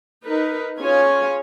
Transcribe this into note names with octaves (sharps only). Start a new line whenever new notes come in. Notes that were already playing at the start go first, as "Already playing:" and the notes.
D#4 A#4 B4
C#4 F4 G#4 C#5 G#5